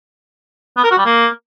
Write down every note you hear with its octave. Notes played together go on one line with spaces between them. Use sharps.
B3
A#4
F#4
G3
A#3